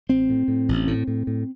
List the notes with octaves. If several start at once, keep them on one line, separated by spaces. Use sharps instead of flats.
A1 C4
A2
A2
A1
A2
A2
A2